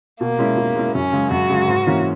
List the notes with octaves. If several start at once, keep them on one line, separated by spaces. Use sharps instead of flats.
B2 A#3
G#3 C#4 E4
B2
G#3 C#4 E4
F#2 C#4
C#3 G#3
F#2 F#4
C#3 G#3
G#2
E3 A#3 C#4